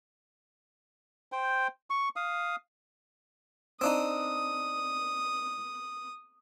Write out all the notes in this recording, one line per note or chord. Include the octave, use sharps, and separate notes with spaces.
C5 G5
C#6
F5 D#6
C4 D4 D#4 D#6